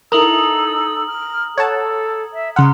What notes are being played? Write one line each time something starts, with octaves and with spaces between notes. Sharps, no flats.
D#4 E4 A4 A#4 A#5 D#6 E6 F#7
F6
A4 C#5 F#5 A5 G#6
E5
C#3 F#5 A#5 C6 F6